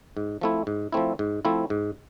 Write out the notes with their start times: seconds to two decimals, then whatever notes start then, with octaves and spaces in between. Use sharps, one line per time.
0.17 G#2
0.41 F3 A3 C4 E4
0.67 G#2
0.92 F3 A3 C4 E4
1.19 G#2
1.45 F3 A3 C4 E4
1.70 G#2